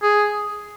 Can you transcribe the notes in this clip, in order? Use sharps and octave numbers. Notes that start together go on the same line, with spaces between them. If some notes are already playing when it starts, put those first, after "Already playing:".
G#4